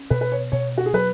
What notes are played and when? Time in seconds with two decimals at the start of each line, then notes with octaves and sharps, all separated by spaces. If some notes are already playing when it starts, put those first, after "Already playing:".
Already playing: C#4
0.10 B2 B4
0.21 B4
0.32 C#5
0.52 B2 C#5
0.78 F#4
0.86 G#4
0.94 F#3 B4